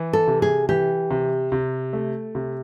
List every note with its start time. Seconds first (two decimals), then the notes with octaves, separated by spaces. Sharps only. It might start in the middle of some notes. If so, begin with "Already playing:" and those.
Already playing: E3
0.13 A4
0.27 C3
0.42 G#4
0.69 E3 G4
1.11 C3
1.52 C3
1.93 A3
2.35 C3